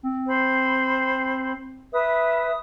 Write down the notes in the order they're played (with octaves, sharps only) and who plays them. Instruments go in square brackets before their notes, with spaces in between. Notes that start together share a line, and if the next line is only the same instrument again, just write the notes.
[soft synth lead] C4
[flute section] C5 B5
[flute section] B4 E5 [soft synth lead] D#6